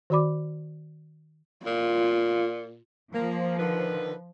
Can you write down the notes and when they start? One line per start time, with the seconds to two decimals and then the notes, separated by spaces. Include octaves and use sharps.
0.10 D#3 F#4 D5 B5 D6
1.66 A#2 F4
3.13 F3 A#3
3.58 D3 D#3 B4